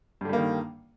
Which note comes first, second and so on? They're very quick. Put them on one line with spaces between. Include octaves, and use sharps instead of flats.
G2 D3 G3 A#3 D#3